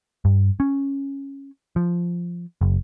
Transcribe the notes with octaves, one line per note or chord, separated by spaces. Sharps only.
G2
C#4
F3
F#1